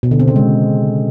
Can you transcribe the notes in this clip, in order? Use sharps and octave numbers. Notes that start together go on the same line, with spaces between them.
B2
D3
C4
C#3
G#3